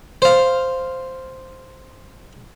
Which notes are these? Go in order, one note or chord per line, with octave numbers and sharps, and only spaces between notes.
C5 F5